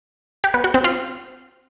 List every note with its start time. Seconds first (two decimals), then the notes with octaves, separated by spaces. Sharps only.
0.44 G4
0.54 B3
0.64 F#4
0.74 C4
0.84 F4